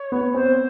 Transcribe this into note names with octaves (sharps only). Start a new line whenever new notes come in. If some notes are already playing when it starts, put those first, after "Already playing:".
Already playing: C#5
B3
C4 C5